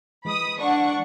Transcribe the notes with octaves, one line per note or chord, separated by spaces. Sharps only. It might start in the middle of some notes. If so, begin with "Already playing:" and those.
E3 G#3 B5 D#6
D4 F#5 C#6